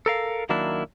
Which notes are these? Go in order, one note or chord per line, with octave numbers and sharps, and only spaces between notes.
A4 A#4 F5
D#3 F#3 A#3 D4 E4